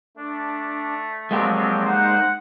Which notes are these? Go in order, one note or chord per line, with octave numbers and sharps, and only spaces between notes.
A3 D4
F3 F#3 G#3 A#3 C4 G4
D#4 C5 F#5